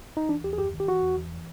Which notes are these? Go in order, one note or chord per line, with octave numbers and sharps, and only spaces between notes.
D#4
E3 D4
D#2 G4
G#4
F#2 G4
D#3
G4
E3 F#4
E2
E3